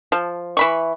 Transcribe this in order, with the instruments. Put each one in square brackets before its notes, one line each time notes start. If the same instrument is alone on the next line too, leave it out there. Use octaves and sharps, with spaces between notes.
[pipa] F3
E3 B5 C#6